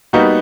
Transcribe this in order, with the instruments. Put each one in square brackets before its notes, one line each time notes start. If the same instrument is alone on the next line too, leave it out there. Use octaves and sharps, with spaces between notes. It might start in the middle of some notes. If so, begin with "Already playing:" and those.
[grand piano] G3 B3 D#4 F#4 [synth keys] A#3